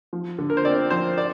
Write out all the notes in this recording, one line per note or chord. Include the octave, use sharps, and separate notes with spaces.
F3
D3
A#4
C5
C4 D5
F3 C5
D5